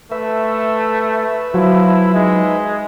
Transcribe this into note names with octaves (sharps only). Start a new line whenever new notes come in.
A3 B4 E5
F3 F#3 E4
G#3 D#4